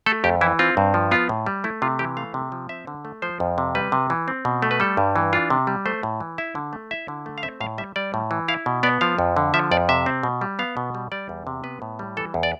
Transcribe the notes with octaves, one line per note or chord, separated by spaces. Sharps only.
A3 A4
F2 G4
E3 E4
C4 F4
G2
F3
B3 F4
A2
G3
A3 E4
C3 F4
E3 G4
A3 F5
C3
F3
C4 E5
D3
A3
F3 C5
F2
C3
G3 B4
C3
E3
C4
B2
A3
B4
G3 A4
G2
E3
D4 F4
C3
G3
A3 C5
A2
E3
E4 E5
D3
A3
E4 E5
D3
A3
F5
C4 E5
A2 F5
G3 E5
G3 D5
A2
E3
E4 F5
B2
B3 D5
F3 F5
F2
D3
F3 E5
F2 D5
C3 E5
C4
B2
G3
B3 F5
B2
G3
G3 D5
E2
C3
B3 B4
A2
G3
E3 A4
E2
D5